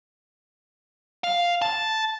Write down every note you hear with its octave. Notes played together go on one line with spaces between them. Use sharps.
F5
A5